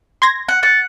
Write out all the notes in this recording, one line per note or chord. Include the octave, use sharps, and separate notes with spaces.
C6 G#6 A#6
F#5
F#5 A6